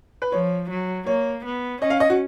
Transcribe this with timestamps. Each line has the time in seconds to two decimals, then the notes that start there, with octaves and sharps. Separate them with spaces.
0.22 B4
0.32 F3 C#5
0.70 F#3
1.07 A#3 C#5
1.45 B3
1.81 C#4 D#5
1.90 F5
2.00 D#5
2.10 F#4